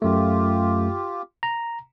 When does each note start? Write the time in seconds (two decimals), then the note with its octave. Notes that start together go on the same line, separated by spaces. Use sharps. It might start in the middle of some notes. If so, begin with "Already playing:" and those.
0.02 F#2 A3 F4 G4
1.43 A#5